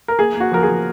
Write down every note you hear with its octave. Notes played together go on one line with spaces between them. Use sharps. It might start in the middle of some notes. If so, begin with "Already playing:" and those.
A#4
A#3 G#4
A#3
F#4
F3 A#4
G#4
F3